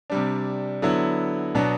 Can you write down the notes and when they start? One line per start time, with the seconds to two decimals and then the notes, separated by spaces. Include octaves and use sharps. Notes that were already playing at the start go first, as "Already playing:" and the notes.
0.10 C3 G3 D4
0.82 D3 F#3 B3 E4
1.55 B2 F#3 B3 D4